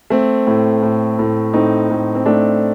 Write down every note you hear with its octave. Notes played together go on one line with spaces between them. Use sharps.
A3 C4
A2
A2
A2
A2 C4 D#4
A2
C4
A3 D4